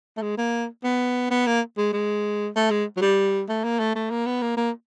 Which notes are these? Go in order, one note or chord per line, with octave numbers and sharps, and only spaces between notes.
A3
G#3
A#3
B3
B3
A#3
G#3
G#3
A3
G#3
F#3
G3
A3
A#3
A3
A3
A#3
B3
A#3
A#3